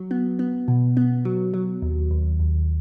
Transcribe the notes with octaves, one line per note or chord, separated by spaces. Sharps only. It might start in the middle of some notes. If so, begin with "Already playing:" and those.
Already playing: F#3
B3
B3
B2
B3
F#3
F#3
D#2
D#2
D#2